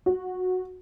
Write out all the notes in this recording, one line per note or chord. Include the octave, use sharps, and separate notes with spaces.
F#4